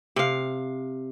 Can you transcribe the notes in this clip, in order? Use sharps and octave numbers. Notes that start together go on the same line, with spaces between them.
C3 F5